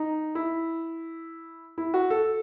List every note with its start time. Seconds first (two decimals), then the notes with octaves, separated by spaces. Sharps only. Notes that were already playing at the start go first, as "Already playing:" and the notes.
Already playing: D#4
0.35 E4
1.78 E4
1.94 F#4
2.10 A4